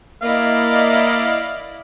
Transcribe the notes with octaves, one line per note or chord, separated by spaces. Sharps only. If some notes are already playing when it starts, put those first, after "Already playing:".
A#3 E4 D5 D#5 F5